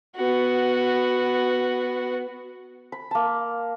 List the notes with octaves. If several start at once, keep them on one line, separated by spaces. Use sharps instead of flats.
B3 F#4
B5
A#3 A5